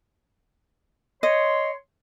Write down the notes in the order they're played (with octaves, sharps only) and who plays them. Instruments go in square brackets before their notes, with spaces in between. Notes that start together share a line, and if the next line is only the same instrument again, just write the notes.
[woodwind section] C#5 C6 [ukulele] D#5